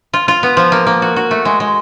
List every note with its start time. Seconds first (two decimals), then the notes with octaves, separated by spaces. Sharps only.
0.13 F4
0.28 F4
0.43 B3
0.57 F3
0.72 A#3
0.87 A#3
1.02 F#4
1.16 F#4
1.31 A3
1.45 G#3
1.60 G#3